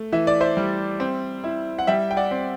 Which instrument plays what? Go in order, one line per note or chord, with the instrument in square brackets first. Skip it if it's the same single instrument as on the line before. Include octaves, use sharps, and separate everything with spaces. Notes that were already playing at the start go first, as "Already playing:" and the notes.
Already playing: [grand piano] A3
E3 E5
D5
C5 E5
G3
C4
E4
F#5
G3 E5 G5
G5
D5 F#5
C4